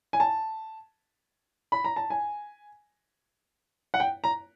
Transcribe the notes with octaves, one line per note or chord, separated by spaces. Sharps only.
G#5
A5
B5
A#5
A5
G#5
F#5
G5
A#5